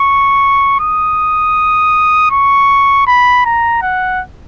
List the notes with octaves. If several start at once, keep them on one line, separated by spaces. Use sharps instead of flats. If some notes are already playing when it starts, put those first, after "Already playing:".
Already playing: C#6
D#6
C#6
B5
A#5
F#5